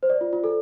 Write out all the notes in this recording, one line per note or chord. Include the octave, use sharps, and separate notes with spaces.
C5
D5
F4
F4
A4